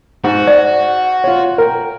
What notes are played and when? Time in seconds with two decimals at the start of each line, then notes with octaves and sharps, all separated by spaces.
0.24 G#2 F#4
0.47 D5
1.24 F4 C#5
1.58 A#4 G5